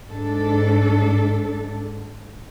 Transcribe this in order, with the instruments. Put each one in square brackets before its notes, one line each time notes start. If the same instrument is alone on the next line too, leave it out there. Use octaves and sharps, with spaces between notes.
[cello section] G#2 D4 A4